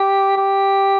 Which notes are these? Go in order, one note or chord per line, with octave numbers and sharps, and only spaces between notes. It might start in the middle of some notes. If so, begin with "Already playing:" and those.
Already playing: G4
G4